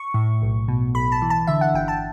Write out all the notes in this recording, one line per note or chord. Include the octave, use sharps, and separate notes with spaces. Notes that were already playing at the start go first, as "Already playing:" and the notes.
Already playing: C#6
A2
B1
B2
B1 B5
A5
E3
A5
D3 E5
F#5
G1 G5
A5